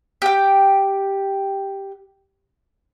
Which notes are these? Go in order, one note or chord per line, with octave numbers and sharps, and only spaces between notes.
G4 G5